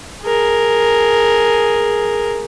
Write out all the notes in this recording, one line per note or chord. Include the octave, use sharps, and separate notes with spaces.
G#4 A#4